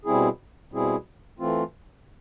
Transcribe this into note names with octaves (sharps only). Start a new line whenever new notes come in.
B2 G3 C4 E4 G#4
B2 G3 C4 E4 G#4
E3 A3 C4 F4